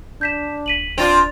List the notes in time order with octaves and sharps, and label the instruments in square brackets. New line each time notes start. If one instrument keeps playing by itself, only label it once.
[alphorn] D4 [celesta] G6 B6 E7
[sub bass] D1 [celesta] B6 D#7 F#7
[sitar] C4 F4 [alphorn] D4 [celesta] D5 A6 F7